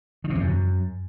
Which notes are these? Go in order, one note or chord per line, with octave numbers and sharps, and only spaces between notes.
D#3
C3
E2
F#2